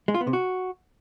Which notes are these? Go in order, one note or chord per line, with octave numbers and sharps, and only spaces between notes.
G#3
F4
B3
C3
F#4